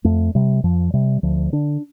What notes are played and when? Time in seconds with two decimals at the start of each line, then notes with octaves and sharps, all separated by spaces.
0.04 F2 A3
0.35 C3 G3
0.64 F2 F3
0.94 C3 G3
1.23 D2 F3
1.52 D3 D4